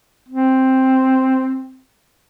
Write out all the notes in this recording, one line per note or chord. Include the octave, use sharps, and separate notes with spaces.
C4